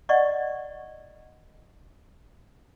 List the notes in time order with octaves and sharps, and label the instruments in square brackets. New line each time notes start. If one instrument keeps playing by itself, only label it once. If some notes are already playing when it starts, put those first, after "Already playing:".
[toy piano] D5 D#5 F#5 C#6